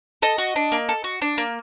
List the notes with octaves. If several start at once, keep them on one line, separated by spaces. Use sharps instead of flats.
A4 D#5
F#4
D4
A#3
A4
F#4
D4
A#3